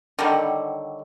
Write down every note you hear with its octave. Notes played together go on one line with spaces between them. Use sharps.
D3 D#3 F#3 G3